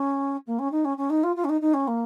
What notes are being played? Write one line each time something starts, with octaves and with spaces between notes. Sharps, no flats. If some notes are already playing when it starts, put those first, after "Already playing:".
Already playing: C#4
A#3
C#4
D#4
C#4
C#4
D#4
F4
F4
C#4
D#4
D#4
C#4
A#3